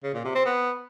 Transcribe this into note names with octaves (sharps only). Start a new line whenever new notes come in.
C#3
A#2
C3
C4
B3